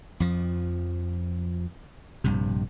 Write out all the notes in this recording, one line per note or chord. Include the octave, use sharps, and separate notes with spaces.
F2 F3
A#1 G2 C3